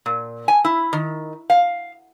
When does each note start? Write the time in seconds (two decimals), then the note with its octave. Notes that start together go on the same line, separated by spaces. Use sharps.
0.06 A#2
0.48 G#5
0.65 E4
0.93 D#3
1.50 F5